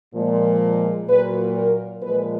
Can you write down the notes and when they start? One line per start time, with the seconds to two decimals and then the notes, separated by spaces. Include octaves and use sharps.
0.14 A#2 F3 G#3
1.08 A#2 F#3 B4
1.56 A#4
2.03 A#2 F3 G#3 B4